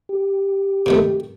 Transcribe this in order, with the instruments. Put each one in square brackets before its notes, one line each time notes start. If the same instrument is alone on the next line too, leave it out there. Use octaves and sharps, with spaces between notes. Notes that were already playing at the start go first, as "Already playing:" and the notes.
[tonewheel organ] G4
[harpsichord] C3 D#3 A3